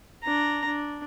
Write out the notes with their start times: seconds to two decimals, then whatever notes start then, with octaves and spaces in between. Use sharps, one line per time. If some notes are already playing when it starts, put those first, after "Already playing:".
0.23 D4 A#5
0.66 D4